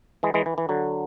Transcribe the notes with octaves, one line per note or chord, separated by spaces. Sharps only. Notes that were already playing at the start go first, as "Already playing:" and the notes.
E3 G#3
E3 G#3
E3
E3
D3 F#3